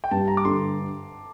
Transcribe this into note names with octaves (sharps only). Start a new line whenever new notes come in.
G5
G2 A5
A#5
D6
D3 C6